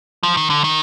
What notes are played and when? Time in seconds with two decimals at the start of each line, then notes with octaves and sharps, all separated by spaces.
0.23 F3
0.37 D#3
0.50 D3
0.64 D#3